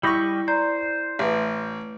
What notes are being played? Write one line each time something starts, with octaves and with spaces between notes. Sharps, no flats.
G3 E4 G4 D#5 B5 C#6
C5 D5 A#5
A1 A3 B4